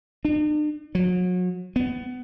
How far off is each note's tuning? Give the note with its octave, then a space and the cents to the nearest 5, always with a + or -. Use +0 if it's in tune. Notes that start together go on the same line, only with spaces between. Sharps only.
D4 +45
F#3 -35
B3 +20